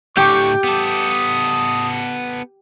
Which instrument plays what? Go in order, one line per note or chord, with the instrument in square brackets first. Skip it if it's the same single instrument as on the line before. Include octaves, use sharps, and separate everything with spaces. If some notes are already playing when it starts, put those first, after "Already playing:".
[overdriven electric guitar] A2 D3 [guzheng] G4 [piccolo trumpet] C#6 [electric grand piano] D6 G6
[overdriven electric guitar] B3 A4 [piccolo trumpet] D#6